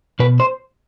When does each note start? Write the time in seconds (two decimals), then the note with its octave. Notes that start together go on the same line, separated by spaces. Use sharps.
0.19 B2 B4
0.40 C5